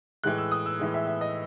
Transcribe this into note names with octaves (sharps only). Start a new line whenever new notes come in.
A2 E3 G#3 F#6
E6
D#6
E6
A2 E3 G#3
E5
E5
D#5